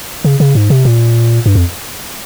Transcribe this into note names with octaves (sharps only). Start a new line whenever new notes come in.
C#3
C#3
G#2
C3
A#2
G2
F2